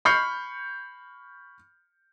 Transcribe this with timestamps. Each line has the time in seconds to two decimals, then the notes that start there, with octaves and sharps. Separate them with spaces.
0.05 B5 C#6 F6 G6 C7 C#7